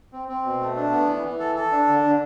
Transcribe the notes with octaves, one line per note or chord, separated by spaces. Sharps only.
C4
C4
B2
A3
D4
B3
E3
E3
A4
A4
D4
D3
D3